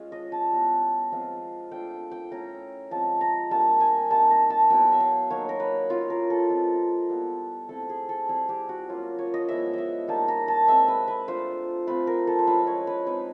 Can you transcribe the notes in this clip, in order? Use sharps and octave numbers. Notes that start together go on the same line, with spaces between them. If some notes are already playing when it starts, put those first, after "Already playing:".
Already playing: G#3 C#4 F4
D#5
A5
G3 B3 E4
F3 G#3 C4 F4
A3 D4 F4 G5
G5
A3 C#4 E4 A#5
F3 G#3 C4 A5
A#5
G3 A#3 D4 A5
G#5
G3 A#3 D#4 A5
A#5
A5
F#3 B3 E4 G5
E5
F5
F#3 A#3 D#4 C#5
A#4
B4
A#3 C#4 E4 F4
A#4
A4
G#3 C4 F4
G3 B3 E4
A3 C4 E4 A4
G#4
A4
G3 C4 E4 G#4
G4
F#4
F#3 A#3 C#4 F4
C#5
D#5
F3 G#3 B3 E4 E5
D#5 E5
G3 A#3 D#4 A5
A#5
A5
G#3 C4 E4 E5
B4
B4
A3 D4 F4 C5
A3 C4 F4 B4
A#4
A4
C5
F3 G#3 C#4 E4 B4
C#5
B4
G#3 C4 D#4 B4